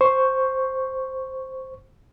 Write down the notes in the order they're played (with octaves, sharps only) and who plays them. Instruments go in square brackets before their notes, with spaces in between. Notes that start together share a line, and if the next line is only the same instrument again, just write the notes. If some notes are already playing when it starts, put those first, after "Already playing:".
[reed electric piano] C5 C#6